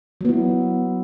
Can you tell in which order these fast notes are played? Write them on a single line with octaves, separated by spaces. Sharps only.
F#3 B3 E4